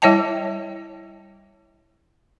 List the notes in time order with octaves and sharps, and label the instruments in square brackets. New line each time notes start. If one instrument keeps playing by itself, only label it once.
[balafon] G3 E4 C#5 D#5 G5 A5